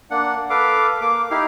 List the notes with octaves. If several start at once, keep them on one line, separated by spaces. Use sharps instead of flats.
A#3 D4 F#5
A4 B4 F5 D6
A#3 D6
D#4 E4 G4 F5